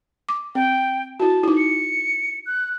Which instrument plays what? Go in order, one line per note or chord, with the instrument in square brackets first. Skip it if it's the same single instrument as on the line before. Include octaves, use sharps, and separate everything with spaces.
[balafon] D6
[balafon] C4 [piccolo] G5
[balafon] E4 F#4 [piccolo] A5
[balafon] D#4 E4
[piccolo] C#7
F#6